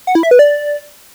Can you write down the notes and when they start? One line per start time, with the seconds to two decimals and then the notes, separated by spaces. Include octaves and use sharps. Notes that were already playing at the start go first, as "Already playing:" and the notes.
0.07 F#5
0.15 E4
0.23 E5
0.31 B4
0.39 D5